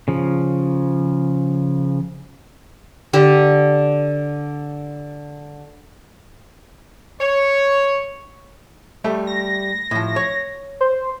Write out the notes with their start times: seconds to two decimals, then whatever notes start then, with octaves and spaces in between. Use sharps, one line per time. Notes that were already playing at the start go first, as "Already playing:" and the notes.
0.08 C#3 F3
3.13 D3 G4 A5
7.21 C#5
9.04 G3 A3 E5
9.27 A#6
9.91 A2 F3
10.16 C#5
10.81 C5